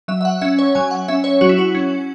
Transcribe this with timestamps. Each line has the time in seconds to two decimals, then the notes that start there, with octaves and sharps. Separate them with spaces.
0.08 F#3 E5
0.21 E5
0.25 F#5
0.41 C#4 E5
0.59 C#5
0.75 F#3 G#5
0.91 F#5
1.08 C#4 E5
1.24 C#5
1.41 F#3 F#4
1.49 E4
1.58 F#4
1.75 C#4